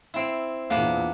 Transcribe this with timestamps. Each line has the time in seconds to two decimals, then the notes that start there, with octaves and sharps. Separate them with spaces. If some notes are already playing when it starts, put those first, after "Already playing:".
0.14 C4 E4
0.70 E2 A#2 A#3 B3 D4